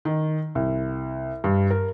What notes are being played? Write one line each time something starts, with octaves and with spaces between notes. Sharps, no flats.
D#3
C2
G2
A#4